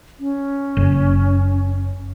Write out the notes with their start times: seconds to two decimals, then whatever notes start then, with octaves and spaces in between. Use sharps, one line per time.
0.20 C#4
0.77 F#1